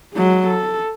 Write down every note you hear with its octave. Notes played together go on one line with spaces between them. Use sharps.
F#3 G#3
A4